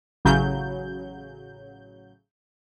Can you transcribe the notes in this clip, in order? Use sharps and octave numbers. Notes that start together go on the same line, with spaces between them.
A1 C#3 F#3 G6